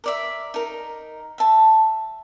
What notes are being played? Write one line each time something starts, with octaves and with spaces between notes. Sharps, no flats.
A#4 D5 E5
D#4 A#4
E5 A5